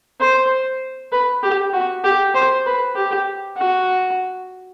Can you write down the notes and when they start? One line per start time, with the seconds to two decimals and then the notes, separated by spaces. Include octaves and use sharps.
0.21 C5
1.12 B4
1.43 G4
1.73 F#4
2.04 G4
2.35 C5
2.66 B4
2.96 G4
3.57 F#4